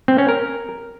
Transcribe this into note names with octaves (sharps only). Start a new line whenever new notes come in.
C4
C#4
A#4